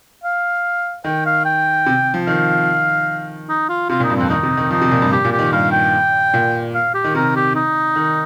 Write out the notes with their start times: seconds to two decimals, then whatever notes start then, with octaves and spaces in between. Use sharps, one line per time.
0.24 F5
1.04 D#3 G5
1.26 F5
1.45 G5
1.86 C3
2.14 F3
2.26 D#3 F5
3.49 D#4
3.69 F4
3.89 C3 F4
4.00 A#2
4.03 D#4
4.10 G2
4.16 F2 C4
4.29 D#3 D#4
4.43 C3
4.57 D#3
4.71 F3 D#4
4.81 C3
4.91 A#2
5.02 G2
5.12 G4
5.25 A#2
5.32 G4
5.39 D#3
5.52 G2 F5
5.72 G5
6.34 A#2
6.75 F5
6.94 G4
7.04 D#3
7.15 C3 A#4
7.36 G4
7.55 D#4
7.96 D#3